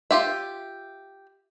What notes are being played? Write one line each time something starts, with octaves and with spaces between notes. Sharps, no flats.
F4 G4 E5